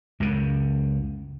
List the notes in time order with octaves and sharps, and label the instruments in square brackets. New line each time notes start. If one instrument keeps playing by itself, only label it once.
[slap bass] C#2 F#2 C#3